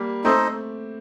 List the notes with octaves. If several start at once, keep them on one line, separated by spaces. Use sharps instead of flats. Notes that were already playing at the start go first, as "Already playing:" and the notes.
Already playing: G3 A#3
A3 C4 D#4 A4 C5 D#5